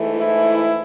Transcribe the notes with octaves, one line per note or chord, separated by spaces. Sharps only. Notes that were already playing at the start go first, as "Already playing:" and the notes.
Already playing: G#2 E3 A3
E4